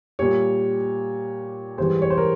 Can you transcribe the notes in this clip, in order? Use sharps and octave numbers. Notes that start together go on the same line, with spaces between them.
A#2 G3 C#5
G#2 E3 G3 C5
C#5
C5
A#4